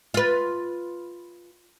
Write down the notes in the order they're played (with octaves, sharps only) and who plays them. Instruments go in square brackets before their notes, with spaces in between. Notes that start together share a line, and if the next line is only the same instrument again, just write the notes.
[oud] F4 B4